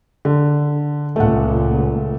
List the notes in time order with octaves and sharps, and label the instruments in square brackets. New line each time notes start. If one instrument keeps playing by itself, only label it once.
[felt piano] D3
[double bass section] C#2 A#2 [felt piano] A3 F#5